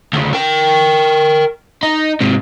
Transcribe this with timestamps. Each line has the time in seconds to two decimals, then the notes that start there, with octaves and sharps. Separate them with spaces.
0.13 D2 C#3
0.33 A#4 G5
1.83 D#4
2.21 G#2 C3